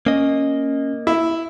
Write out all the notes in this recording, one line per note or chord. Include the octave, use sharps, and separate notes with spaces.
A#3 C#4 D#5
E4